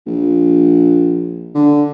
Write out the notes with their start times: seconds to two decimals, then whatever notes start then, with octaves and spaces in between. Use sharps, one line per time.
0.06 A#1
1.55 D3